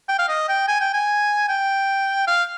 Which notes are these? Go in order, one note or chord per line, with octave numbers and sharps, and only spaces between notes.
G5
F5
D#5
G5
G#5
G5
G#5
G5
F5